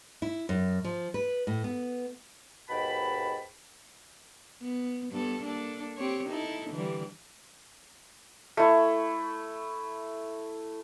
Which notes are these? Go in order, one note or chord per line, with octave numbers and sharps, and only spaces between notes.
E4
F#2
F3
B4
A2
B3
D#2 G#2 B2 G5 A5 B5
B3
G2 B3 A4
A#3 D4 A4
C4 G4 C#5
D#4 E4 A4
D3 E3 G3
A3 E4